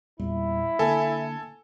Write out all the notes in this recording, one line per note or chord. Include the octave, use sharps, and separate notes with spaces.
E2 A#2 G3 E4
D3 A#3 A4 G#5